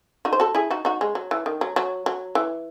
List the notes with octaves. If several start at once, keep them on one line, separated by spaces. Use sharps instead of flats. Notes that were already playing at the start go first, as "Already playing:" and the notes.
D#4 F#4
C5
F#4 A4
E4 G#4
D#4 F#4
D#4 F#4
G#3
F#3
E3
D#3
F#3
F#3
F#3
E3